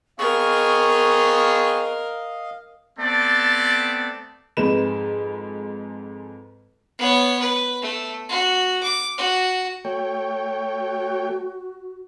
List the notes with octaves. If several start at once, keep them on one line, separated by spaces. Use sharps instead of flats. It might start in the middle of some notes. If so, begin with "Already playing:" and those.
B3 C4 G#4 A#4 D#5 F5 C#6
A3 B3 C4 D5 A5
F2 G#2 G#3 D#4 B4 E7
B3 C#5
B4
A3
F#4
D6
F#4
A3 F#4 C#5 G5